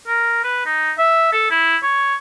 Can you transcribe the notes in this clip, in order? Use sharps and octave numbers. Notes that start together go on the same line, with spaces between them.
A#4
B4
D#4
E5
A4
E4
C#5